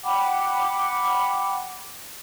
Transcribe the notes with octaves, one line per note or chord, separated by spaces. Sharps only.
F#5 G5 B5 D6